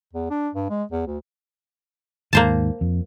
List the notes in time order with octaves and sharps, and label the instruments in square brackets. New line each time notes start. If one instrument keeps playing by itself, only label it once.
[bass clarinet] E2
D4
G2
G#3
E2
D2
[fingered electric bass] D#2 G#2 [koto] A#3 C5 A5
[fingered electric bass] F2